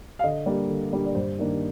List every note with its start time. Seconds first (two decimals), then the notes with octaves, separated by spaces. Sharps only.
0.19 F5
0.23 D3 D#5
0.46 G3 A#3 D4
0.69 D3
0.93 G3 A#3 D4
1.05 D5
1.15 G2 C5
1.39 D#3 A#3 D4